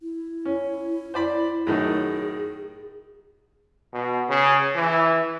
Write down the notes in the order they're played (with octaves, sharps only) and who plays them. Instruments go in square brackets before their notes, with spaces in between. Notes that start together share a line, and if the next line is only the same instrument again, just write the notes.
[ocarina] E4
[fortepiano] C#4
C5 D5 B5
[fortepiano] F#2 A2 D#3 [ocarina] G#4
[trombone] B2
C#3
E3